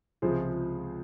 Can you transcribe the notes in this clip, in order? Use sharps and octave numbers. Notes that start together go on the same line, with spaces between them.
C#2 C3 F3 G#3 G#4 C5